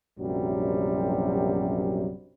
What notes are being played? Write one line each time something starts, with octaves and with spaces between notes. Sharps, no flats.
A#1 F#2 C3 F#3 G3